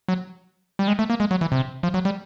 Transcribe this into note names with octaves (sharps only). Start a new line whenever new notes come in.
F#3
G3
G#3
A3
A#3
G#3
F#3
E3
C3
F3
F#3
G3